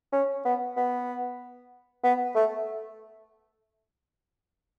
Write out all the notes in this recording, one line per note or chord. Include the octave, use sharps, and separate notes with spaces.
C#4
B3
B3
B3
A3